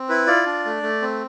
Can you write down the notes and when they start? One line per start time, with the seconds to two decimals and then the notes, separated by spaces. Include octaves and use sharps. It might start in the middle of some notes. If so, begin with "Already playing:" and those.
Already playing: C4
0.09 E4 B4
0.27 F4 D5
0.46 D4
0.65 A3
0.83 A3
1.02 C4